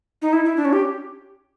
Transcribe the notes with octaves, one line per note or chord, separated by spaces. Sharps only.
D#4
E4
E4
D4
C#4
G4